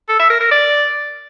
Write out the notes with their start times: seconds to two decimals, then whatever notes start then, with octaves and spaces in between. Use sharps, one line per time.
0.09 A4
0.19 E5
0.30 A#4
0.41 A#4
0.51 D5